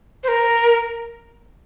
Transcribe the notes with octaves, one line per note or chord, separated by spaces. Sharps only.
C5
A#4